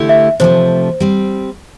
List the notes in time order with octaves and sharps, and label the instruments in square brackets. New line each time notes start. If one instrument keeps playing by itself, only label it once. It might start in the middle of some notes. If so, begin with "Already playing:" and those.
Already playing: [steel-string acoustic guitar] D3 A3 E4 G4
[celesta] E5
[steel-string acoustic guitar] C3 F3 A3 [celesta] C5
[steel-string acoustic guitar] G3 C4